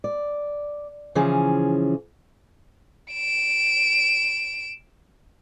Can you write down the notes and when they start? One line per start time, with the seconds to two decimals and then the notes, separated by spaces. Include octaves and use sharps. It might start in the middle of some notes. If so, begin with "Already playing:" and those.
0.04 D5
1.15 C#3 E3 F3 C#4 G#4
3.13 D7 E7